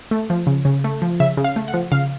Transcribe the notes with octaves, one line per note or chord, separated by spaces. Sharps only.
A3
F3
C#3
C#3
A3
F3
C#3 E5
C#3
F5
A3
F#5
F3
C#3 F5